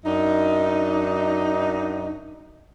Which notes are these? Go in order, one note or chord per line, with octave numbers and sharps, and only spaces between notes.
F#2 D4 D#4